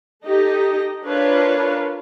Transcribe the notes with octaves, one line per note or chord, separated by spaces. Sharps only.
D#4 G4 A4 D#5
D4 F4 A#4 B4 C#5